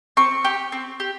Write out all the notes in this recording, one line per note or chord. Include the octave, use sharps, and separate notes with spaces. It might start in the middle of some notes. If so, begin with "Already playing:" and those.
C4 C#6
G4
C4
G4